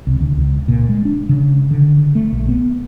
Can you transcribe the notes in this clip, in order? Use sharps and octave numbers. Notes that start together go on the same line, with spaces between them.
C2
D2
C#2
A#2
G#3
D4
C#3
D3
A3
A#1
B3